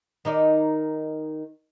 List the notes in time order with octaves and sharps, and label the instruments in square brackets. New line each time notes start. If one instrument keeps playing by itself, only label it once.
[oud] D#3 D#4 D5